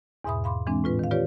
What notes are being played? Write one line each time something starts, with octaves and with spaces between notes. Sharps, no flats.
E2 G#2 B2 E5 B5 D#6
F5 B5 C6 D6
E3 G#3 C4 D4
A2 F4 B4
D#3 F5
F4 G4 B4 C#5 D5